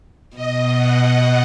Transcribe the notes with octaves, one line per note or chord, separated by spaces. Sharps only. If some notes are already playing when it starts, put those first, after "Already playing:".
B2 D#5
F#5